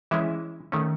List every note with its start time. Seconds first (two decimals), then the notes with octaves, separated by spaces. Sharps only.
0.11 E3 G#3 C#4 E4 E5
0.72 D#3 A3 C#4